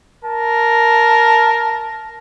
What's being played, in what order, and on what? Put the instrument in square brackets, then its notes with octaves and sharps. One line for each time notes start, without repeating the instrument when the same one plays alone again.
[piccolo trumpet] A#4 [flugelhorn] A5